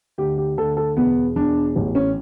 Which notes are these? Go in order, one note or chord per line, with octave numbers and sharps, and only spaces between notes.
D2 G4
G4
D2 A4
A4
E1 B3
E1 D4
A1
C#4